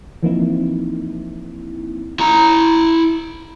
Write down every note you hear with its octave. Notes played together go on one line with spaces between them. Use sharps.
E3 F3 A#3 C4 D#4 E4
E4 A#5